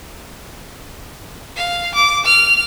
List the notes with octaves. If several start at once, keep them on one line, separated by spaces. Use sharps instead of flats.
F5
D6
F6